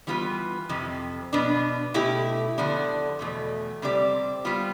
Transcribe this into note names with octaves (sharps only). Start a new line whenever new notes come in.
E3 G3 B3 F4 B4
F2 C3 F3
B2 B3 D4
B2 A3 E4 G4
D3 F3 B3 D4
E2 B2 A3
C3 G3 C4 G4 D5
G3 B3 F4